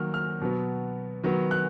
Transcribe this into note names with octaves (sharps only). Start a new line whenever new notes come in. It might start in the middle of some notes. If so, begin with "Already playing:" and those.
Already playing: D#3 F#3 A#3 F6
F6
B2 F#3 B3
D#3 F#3 B3
F#6